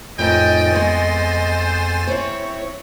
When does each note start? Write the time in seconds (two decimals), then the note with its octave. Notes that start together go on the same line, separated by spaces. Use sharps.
0.19 F2 A2 D#3 F3 D#5 G5 G#5 A6
0.73 G#3 B3 C5 C#5
2.07 C4 E4 C#5